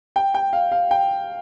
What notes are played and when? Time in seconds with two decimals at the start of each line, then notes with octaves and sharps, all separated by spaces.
0.16 G5
0.34 G5
0.53 F5
0.72 F5
0.91 G5